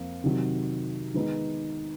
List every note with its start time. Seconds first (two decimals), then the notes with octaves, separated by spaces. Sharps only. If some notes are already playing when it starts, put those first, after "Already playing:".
Already playing: F2 F3 A#3
0.24 C3 D#3 F#3
1.14 D#3 G#3 B3 D#4